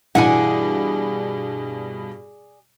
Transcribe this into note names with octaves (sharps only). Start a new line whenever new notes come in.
G2 B2 E3 G3 G#4 D5 F#5 G#5